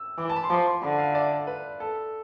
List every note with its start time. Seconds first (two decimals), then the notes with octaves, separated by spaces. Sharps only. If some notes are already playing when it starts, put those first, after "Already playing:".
Already playing: E6
0.18 E3 D6
0.30 A5
0.36 B5
0.44 C6
0.50 F3 D6
0.67 C6
0.82 D3 B5
0.98 F5
1.11 E5
1.15 D5
1.47 B4
1.80 A4